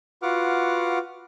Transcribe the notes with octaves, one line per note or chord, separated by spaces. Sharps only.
F4 F#4 B4 F#5 D6 F6